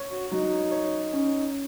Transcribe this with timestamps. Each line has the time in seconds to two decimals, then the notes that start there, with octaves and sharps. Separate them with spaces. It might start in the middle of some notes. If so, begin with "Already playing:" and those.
Already playing: C#5
0.11 F#4
0.31 F#3 D#4
0.71 C#5
1.12 C#4